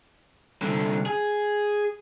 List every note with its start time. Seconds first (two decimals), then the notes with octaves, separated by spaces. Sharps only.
0.62 C2 D3
1.06 G#4